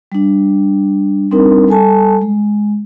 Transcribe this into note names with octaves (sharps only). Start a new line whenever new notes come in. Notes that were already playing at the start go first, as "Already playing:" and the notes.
G3 D4
G3 C4 D4 D#4 A#4
G3 A4 G#5 A5
G#3